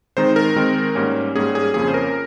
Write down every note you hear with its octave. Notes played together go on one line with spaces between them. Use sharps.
D#3 G#3 C4 D#4 C5
A#4
D#3 G#3 C4 D#4
G#2 G3 A#3 C#4
G#2 G3 A#3 C#4 G#4
G#4
F2 C#3 F3 A#3 C#4 G#4
C5
A#4